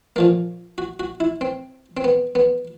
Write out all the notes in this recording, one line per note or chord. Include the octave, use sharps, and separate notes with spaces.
A#2 F3 A#3
F#4
F#4
E4
C4
C4
B3
B3